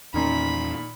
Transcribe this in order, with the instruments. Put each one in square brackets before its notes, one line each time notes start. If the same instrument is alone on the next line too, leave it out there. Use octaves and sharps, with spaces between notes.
[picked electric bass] E2 C#4 [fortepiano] A#2 D#3 [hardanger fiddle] B5